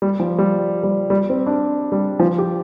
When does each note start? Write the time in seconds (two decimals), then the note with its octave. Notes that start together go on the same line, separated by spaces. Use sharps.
0.02 G3
0.20 F3
0.39 G3
0.83 G3
1.10 G3
1.29 C4
1.47 D4
1.92 G3
2.19 F3
2.38 G4